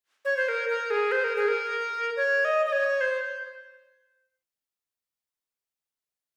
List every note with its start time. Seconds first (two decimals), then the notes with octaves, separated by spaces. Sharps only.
0.25 C#5
0.37 C5
0.48 A#4
0.69 A#4
0.90 G#4
1.12 C5
1.24 A#4
1.36 G#4
1.48 A#4
2.17 C#5
2.45 D#5
2.66 D#5
2.72 C#5
3.01 C5